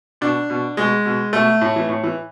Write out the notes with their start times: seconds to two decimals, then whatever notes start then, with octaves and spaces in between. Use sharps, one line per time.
0.21 B2 D4
0.50 B2
0.77 B2 G#3
1.05 B2
1.33 B2 A3
1.62 A2
1.76 E3
1.89 A2
2.03 E3